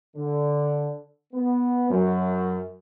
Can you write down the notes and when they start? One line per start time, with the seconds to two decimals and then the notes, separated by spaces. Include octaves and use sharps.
0.15 D3
1.33 B3
1.90 F#2